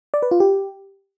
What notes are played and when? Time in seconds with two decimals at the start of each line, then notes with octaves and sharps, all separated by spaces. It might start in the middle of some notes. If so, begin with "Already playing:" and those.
0.14 D5
0.22 B4
0.31 F4
0.40 G4